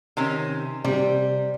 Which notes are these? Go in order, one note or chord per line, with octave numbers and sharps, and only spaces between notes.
C3 D#3 C#4
C3 G3